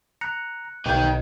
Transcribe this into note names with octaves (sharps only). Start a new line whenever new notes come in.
A#5 F#6 C#7
B1 D#4 G5 G#6